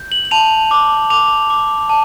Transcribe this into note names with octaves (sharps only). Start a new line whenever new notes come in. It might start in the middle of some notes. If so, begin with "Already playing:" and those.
Already playing: G6
F#7
F#7
A5 F7
D6
D6 F7
D6
A5